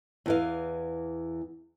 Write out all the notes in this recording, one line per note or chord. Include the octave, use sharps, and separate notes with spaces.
E2 E3 F5